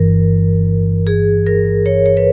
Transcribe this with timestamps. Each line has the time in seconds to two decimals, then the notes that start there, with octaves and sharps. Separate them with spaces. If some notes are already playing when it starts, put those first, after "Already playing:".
Already playing: G1 G2 E3 A#4
1.07 G#4
1.47 A#4
1.86 C#5
2.06 C#5
2.17 B4